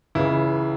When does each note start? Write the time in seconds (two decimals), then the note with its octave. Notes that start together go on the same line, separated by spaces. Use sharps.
0.15 C#2 C#3 E3 E4